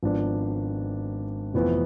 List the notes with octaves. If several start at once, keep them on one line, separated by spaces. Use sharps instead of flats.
G#1 G#2 F3 B3 D4
F1 F2 E3 B3